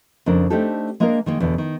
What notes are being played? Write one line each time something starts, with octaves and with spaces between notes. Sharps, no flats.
F2 C#3 D4 A#4
A3 C4 D4 D#4 G4 A4
G#3 A#3 D4 G#4 A#4
D#3 G#3 A#3
E2 B2 D3
D#3